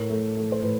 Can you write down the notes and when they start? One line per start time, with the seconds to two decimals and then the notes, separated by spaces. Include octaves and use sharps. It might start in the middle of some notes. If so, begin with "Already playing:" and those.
Already playing: A2 A#4
0.10 A3
0.37 A3
0.52 C5
0.62 A2 B4